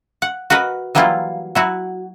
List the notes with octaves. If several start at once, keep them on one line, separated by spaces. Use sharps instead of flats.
F#5
F#4 A#4 B4 D#5
E3 F#3 G3 A#3 E4 F4
F#3 E4 F#4